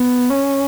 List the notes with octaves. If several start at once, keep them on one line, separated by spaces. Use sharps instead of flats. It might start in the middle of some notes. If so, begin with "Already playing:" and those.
Already playing: B3
C#4